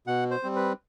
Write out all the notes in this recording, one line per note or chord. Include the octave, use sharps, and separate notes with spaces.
B2 F#5
C5
G3 C4
B4